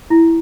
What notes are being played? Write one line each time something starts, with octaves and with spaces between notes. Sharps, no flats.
E4